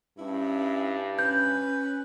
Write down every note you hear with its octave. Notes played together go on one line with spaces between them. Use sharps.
G2 C#4 E4
C#4 B4 G6